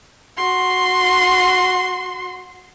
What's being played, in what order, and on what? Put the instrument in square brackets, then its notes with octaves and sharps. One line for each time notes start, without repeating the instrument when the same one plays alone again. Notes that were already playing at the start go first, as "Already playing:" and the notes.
[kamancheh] F#4 C6